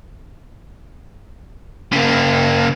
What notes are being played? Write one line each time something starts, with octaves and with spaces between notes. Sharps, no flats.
C#3 A#3